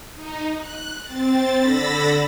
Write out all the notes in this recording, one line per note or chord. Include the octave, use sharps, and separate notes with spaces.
D#4
F#6
C4 A6
D3 B5 E6 A6 A#6